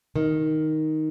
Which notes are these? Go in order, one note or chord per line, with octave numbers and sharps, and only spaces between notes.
D#3